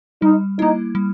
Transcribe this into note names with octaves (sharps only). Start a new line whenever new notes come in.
G3 D#4
A#3 D#4 E4
G3